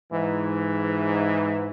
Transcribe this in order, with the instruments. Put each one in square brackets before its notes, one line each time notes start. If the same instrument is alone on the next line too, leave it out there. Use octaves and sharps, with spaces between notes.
[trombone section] G#2 E3